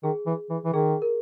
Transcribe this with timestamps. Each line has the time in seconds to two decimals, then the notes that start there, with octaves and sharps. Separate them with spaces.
0.04 D#3 G#4
0.26 E3
0.50 E3
0.65 E3
0.73 D#3 G#4
1.02 A#4